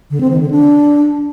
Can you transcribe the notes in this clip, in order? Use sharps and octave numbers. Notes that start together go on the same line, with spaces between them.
D3
C4
D#3
D3
D4